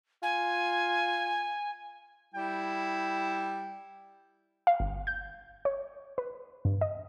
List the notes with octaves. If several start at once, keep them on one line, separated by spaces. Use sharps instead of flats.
F4 G#5
G3 E4 G5
F5
G1
G6
C#5
B4
G2
D#5